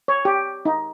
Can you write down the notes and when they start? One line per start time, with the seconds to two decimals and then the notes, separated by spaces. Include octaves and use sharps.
0.08 C#5
0.25 G4
0.65 D#4